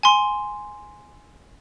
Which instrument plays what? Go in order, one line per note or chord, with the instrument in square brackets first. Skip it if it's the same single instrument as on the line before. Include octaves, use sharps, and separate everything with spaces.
[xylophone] G#5 C6